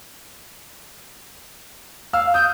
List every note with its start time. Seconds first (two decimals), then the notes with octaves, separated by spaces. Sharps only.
2.13 F5 E6 F6
2.34 D#6 G6